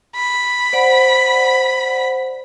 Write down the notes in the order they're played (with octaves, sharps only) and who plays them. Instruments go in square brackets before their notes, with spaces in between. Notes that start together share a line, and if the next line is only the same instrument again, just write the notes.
[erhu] B5
[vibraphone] C5 D5 F#5